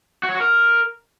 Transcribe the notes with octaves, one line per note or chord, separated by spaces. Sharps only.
F#4
C#5
F#4
A#4